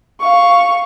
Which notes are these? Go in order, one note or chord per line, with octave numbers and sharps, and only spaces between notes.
F5 C#6